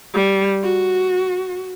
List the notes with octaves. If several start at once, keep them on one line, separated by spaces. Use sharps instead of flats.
G3
F#4